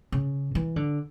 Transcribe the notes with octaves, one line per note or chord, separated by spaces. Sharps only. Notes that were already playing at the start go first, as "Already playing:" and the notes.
C#3
E3
D3